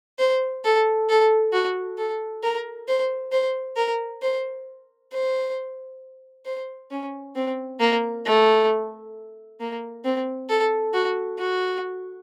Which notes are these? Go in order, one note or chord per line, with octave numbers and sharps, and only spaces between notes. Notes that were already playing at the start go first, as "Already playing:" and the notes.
C5
A4
A4
F#4
A4
A#4
C5
C5
A#4
C5
C5
C5
C#4
C4
A#3
A3
A#3
C4
A4
F#4
F#4